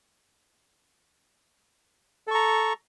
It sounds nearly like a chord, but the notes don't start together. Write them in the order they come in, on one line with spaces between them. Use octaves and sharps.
A4 C#6 A#5